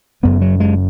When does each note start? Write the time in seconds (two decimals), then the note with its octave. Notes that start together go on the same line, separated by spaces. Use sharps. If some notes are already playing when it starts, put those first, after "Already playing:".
0.23 F#1 F#2 C#3 B3
0.41 F#3
0.60 G#3